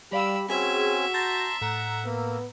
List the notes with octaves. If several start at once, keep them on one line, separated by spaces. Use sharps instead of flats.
G3 G4 D5 F5 B5 E6
C4 C#4 F#4 G#4 E5 G#5
A5 A#5 C6 G6 A6 A#6
A2 F#5 A#5 E6
A#3 B3